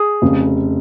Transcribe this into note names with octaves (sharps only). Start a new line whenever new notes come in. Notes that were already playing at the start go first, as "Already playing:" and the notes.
Already playing: G#4
F1 F2 C#3